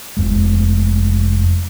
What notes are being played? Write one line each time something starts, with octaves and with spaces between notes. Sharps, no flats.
F1 F2 G#3